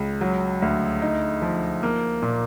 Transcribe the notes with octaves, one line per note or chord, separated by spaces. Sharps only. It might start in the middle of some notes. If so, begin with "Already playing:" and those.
Already playing: C#2
F#3
D2
D#4
F3
A#3
A#2